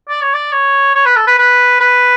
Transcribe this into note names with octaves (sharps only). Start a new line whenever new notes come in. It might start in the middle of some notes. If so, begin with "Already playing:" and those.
D5
C#5
D5
C#5
C#5
B4
A4
B4
B4
B4